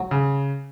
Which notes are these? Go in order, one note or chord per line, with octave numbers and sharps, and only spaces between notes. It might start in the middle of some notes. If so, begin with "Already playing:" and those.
Already playing: F#3
C#3